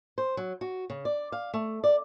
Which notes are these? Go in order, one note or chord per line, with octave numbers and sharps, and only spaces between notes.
C5
F#3
F#4
C#3
D5
F5
A3
D5